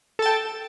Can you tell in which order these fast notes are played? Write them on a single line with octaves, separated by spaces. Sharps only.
A4 A5 G5